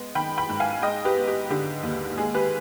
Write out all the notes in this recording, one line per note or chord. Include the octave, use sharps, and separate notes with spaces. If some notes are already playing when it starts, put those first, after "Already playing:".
Already playing: G#3 B3
D#3 G5 B5
G5 B5
G#2
F5 G#5
G#3 D#5 G5
G4 B4
B3
G4
D3 G4
D#2
G#3 G#4
G4 B4